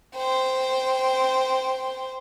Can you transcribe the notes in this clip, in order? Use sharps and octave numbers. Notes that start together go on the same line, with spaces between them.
C5 G5